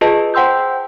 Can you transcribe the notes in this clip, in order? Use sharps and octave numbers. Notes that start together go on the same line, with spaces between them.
F4 G#4 B4 D#5 A5
C5 F#5 G5 C6 E6 G6